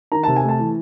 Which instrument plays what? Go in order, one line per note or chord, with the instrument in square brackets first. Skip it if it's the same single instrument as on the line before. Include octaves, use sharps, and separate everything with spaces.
[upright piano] D#3 A#5
C3 A5
G#5
A3 A5
E3